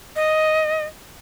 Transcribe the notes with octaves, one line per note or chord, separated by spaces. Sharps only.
D#5